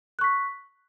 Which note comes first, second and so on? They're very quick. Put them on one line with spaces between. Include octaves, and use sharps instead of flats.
F#6 C#6 B6